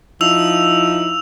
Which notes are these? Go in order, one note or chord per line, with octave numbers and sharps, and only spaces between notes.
F3 D#4 E4 E6 F7